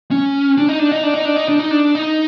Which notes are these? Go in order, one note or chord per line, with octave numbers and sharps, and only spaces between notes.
C#4
D4
D#4
D4
D#4
D4
D#4
D4
D#4
D4
D#4
D4
D#4